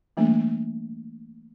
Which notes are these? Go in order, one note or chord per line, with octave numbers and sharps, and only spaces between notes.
E3 G3 A3 A#3 D4